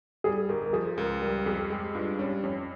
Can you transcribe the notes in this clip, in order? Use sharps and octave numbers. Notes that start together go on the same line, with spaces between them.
G3 G#4
G1 A#4
A#4
F3 G#4
C#2 A#4
G3 A#4
F2 G#4
G#3 G4
G2 F4
G3 C#4
F2 C#4